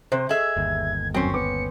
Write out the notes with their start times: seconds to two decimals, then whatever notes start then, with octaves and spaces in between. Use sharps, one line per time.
0.12 C3 C5
0.29 G#4 A4 D#5 E5 G#6
0.57 G1 D#2
1.14 F#2 C4 C#4 C7
1.34 B3 B4 D6 C#7